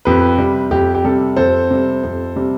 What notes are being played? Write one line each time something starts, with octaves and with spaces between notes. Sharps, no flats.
F2 G4 B4
C3 G3
F2 G4
G4
C3 G3 A4
F2 A4 C5
C3 G3
F2
C3 G3